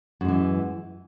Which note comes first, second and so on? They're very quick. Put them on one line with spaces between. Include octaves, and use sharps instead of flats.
F#2 G#3 E3